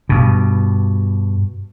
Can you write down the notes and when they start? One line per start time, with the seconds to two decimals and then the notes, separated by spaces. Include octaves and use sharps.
0.09 G2 B2